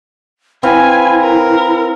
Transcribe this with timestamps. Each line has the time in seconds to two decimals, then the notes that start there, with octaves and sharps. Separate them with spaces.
0.63 C4 E4 B4 F5 G#5
1.20 A#4